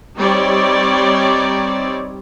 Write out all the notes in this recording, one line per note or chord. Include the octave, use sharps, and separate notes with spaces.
G3 C4 D#4 G4 C#5 D5